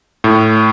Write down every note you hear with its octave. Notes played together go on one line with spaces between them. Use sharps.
A2